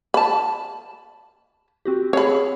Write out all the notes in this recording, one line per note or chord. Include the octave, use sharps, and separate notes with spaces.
A5 B5
C4 F#4 G4
C4 G#4 C#5 B5